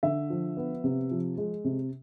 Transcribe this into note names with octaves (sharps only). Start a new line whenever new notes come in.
D3 E5
F3
B3
C3
F3
G#3
C3